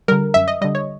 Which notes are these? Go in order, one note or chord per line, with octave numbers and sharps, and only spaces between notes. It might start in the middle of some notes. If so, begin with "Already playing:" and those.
D3 G3 A#4
F#2 E5
D#5
D3 G3 D#5
C#5